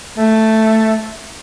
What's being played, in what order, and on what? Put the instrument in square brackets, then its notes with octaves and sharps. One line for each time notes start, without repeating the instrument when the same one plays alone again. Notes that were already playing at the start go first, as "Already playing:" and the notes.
[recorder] A3